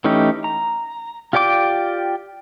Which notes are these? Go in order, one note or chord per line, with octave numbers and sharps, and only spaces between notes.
E3 A3 C#4 D#4 G4
A#5
F4 G4 D5 G5 D6